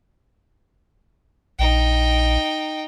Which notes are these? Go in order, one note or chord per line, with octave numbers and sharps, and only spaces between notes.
A#1 D#4 G5